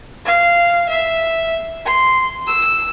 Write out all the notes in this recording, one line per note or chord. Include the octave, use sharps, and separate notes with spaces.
F5
E5
C6
E6